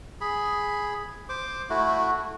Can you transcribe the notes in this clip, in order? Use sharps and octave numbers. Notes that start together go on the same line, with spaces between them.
G#4 B5
C5 D6
A3 E4 F#4